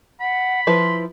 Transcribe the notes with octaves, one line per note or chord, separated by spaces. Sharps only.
F#5 B5
F3 E4 B4 C6